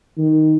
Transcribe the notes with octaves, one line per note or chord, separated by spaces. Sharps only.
D#3